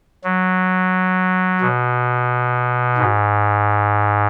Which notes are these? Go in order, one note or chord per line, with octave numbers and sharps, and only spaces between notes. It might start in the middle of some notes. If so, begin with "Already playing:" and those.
F#3
B2
G#2